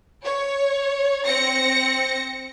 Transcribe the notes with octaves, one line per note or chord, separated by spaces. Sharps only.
C#5
C4 A#6 C#7